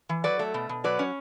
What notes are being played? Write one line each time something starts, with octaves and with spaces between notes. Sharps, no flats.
E3
F#3 B4 D5
A3
B2
B2
F#3 B4 D5
C#4